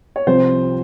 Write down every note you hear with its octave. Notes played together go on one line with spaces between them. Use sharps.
C#5
C2 C3 F3 C5